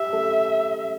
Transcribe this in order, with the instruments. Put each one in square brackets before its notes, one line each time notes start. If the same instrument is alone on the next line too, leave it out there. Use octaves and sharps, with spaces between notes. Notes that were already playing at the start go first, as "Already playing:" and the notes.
Already playing: [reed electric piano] G4 [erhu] E5
[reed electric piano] A4